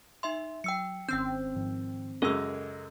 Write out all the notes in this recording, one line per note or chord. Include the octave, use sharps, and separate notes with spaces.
D#4 E5 C6
F#3 G5 E6 C#7
G#1 D#3 C4 C#4 G5 E6 G6
G#2 D#3 F3
F#2 C#3 G#3 A4 A#4 D#5 E6